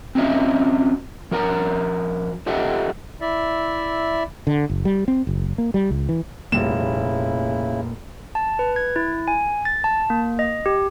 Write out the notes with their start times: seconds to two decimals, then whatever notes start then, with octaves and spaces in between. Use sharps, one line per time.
0.15 C4 C#4 F4 F#4 D#5 E5
1.31 F3 F#4 A#4 F#5 A#5
2.47 F4 G4 A4 D#5 E5 F#5
3.21 E4 D5 E5
4.47 D3
4.69 F#1
4.85 G3
5.08 C4
5.27 F#1
5.58 A#3
5.74 G3
5.90 C#2
6.09 E3
6.52 F1 A#2 C#3 G3 A#3 E4 E7
8.35 A5
8.59 B4
8.76 G#6
8.96 E4
9.28 G#5
9.65 A6
9.84 A5
10.10 A#3
10.39 D#5
10.66 G4